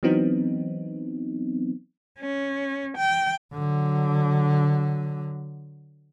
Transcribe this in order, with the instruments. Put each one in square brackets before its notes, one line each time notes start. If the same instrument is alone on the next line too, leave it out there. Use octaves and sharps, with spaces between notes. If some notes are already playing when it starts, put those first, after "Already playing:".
[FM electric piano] E3 F#3 B3 C4 D#4
[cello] C#4
G5
[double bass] D3 F#3